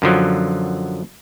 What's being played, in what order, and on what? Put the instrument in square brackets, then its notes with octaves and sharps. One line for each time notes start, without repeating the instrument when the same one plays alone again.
[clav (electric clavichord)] F#2 D3 F3 F#3